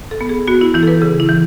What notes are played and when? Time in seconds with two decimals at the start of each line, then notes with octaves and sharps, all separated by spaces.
0.11 A4
0.21 B3
0.29 G#4
0.47 B3 F#4
0.61 E4
0.74 E3 E4
0.83 A4
0.88 B4
1.02 C#3 G#4
1.20 E4
1.29 E3